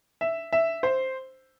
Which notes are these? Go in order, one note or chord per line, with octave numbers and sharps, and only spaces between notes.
E5
E5
C5